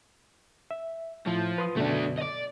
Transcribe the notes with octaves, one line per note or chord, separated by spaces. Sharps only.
E5
A2 F3 E4
B4 C6 D#6
F#2 B2 D3 A3 D4
D5 D#5